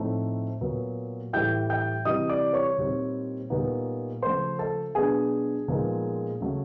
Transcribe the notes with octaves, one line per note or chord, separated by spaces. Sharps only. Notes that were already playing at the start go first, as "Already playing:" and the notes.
Already playing: A2 F3 A3 C4 D#4
A#2 F#3 B3
A2 E3 G3 G5 G6
G5 G6
C3 E3 G3 D#5 D#6
D5 D6
C#5 C#6
A#2 G3 C4 D#4
A#2 G3 B3 D#4
C#3 F3 A3 C5 C6
A4 A5
B2 F#3 B3 D4 G#4 G#5
A#2 F3 G#3 B3 D#4
C#3 F#3 A3